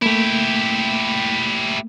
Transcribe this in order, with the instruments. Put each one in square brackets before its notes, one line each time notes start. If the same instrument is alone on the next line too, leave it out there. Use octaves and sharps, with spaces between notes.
[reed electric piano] A3 A#3 [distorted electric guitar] E4 G4